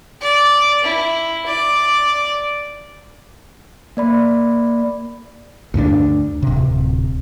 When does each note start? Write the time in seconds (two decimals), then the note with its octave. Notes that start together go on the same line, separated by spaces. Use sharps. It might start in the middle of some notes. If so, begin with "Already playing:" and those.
0.22 D5
0.84 E4
1.47 D5
3.97 A#3 D5 B5
5.74 D2 G2 G3 D4
6.42 D1 C3